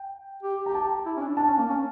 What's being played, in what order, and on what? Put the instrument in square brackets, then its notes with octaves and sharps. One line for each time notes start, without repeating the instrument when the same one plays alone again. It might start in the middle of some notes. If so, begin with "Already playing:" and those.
Already playing: [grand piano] G5
[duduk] G4
[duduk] G4 [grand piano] A#5
[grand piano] A5
[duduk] E4
C#4
D4
[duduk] D4 [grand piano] A5
[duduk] C#4
A#3
C#4